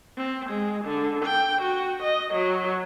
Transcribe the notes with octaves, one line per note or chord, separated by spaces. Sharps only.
C4
G#3
D3
G5
F#4
D#5
F#3